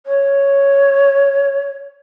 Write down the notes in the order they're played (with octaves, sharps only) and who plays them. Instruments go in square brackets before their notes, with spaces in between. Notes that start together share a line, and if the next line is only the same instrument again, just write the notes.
[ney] C#5